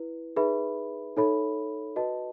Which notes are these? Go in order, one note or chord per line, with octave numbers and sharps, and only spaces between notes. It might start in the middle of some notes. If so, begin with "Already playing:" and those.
Already playing: E4 B4
D#4 G#4 B4 E5 B5
D#4 A4 C#5 E5 B5
F#4 B4 D#5 A5